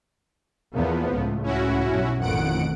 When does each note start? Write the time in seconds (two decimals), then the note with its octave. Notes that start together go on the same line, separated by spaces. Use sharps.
0.75 E2 F3 A#3 B3
1.09 C#2 A2
1.44 C#4 E4 F#4
1.90 B1 G2
2.19 A1 F2 B2 D#3 F#5 D7